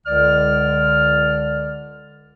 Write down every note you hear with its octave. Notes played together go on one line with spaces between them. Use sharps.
C#2 D3 D5 F6